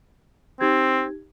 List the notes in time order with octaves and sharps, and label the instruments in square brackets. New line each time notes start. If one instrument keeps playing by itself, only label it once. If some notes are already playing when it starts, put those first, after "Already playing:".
[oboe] C4 [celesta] D#4 G4 G#6